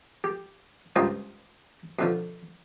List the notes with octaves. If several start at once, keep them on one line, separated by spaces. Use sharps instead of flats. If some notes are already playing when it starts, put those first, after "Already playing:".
G4
C#2 G2 F4 C5 A#5 D#6
B2 D3 F3